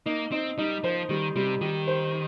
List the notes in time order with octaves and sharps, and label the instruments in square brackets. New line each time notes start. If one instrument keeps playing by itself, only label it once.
[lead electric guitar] A#3 [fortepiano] D#4
[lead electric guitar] C4 [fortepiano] D#4
[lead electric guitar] G3 [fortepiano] D#4
[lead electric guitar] F3 [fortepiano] C5
[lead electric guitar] D#3 [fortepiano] G3
[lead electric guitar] C3 [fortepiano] G3
[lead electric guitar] D#3 [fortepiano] G4
[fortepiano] C5